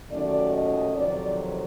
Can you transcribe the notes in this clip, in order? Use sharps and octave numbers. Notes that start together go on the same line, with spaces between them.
D#2 D#3 F#3 A3 C#4 D5
D#5
F2 C3 D#3 F#3 D5